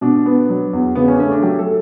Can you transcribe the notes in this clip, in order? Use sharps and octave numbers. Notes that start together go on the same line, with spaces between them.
B2 D4
B3
F#3
E2
C#3 B3
C#4
D4
A3 C#4
D4
F#3 G4
A4